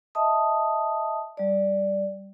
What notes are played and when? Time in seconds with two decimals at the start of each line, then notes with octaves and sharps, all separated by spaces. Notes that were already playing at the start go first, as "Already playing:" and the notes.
0.15 D#5 E5 A5 D#6
1.37 G3 D5